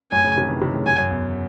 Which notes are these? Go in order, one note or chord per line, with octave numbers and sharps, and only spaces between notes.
F#2 A2 G#5
A2 C#3
C3 D#3
C#3 E3
C3 D#3
A2 C#3
F#2 G#5
F#2
E2